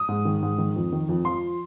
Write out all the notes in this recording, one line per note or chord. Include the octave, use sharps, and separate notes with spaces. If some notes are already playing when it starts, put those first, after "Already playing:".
Already playing: D#6
G#2
D#3
G#2
D#3
F2
D#3
F2
F3 C6